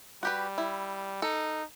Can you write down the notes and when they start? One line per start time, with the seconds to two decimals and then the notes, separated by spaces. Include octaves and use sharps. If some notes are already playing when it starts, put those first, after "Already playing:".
0.23 G3 F#4 G4 B4
0.58 E4
1.22 D#4 A4